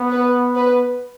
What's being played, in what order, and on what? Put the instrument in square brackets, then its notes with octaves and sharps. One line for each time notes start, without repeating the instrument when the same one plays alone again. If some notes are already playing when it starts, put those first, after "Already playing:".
Already playing: [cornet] B3
[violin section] B4
B4